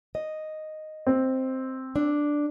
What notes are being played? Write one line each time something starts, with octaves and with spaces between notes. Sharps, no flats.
D#5
C4
D4